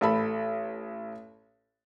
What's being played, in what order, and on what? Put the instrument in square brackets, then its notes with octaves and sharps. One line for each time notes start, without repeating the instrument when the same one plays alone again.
[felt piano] A1 A4 B5